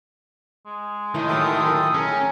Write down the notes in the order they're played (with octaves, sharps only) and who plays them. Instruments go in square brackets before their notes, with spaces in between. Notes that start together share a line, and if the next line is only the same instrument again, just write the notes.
[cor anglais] G#3
[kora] A2 D#5 [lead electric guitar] D#3
[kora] E3 F#3 F4 [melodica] A4 G5 D#6
[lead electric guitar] C#4 [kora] G#4 [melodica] A#4